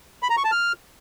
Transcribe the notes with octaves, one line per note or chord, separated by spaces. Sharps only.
B5
A#5
C#6
A5
F6